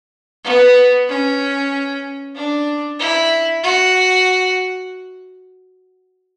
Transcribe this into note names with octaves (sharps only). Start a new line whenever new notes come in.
B3
C#4
D4
E4
F#4